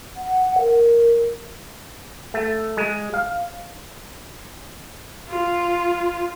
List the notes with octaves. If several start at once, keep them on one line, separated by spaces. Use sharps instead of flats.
F#5
A#4
A3
G#3
F5
F4